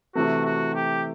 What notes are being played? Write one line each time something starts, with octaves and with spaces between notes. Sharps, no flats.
C3 E3 A3 F#4
F#4
G4